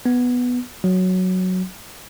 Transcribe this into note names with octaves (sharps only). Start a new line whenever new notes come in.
B3
F#3